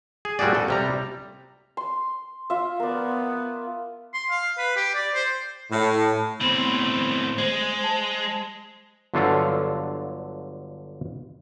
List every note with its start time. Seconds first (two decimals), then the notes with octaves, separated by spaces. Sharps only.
0.25 G#4
0.39 A#2 G3 A3 F#4 G#4 D5
0.55 A4
0.68 C3 G3 A#5
1.77 C6
2.50 F4 E5
2.80 B3 A#4 D5
4.14 C6
4.30 F5
4.58 B4
4.77 G4
4.95 D5
5.14 C5
5.70 A2
6.41 A2 B3 C4 C6
7.38 G#3 C5
7.83 C5 A5
9.14 G1 D3 F#3 F4 A4 F5